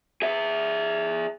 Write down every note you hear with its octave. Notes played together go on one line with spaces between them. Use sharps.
G#4 E5